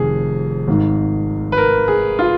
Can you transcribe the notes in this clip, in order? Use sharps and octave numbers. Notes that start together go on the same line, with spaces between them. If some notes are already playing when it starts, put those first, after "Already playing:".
Already playing: F1 F2 D#3 G#4
G#1 G#2 D#3
B4
A#4
G#4
F4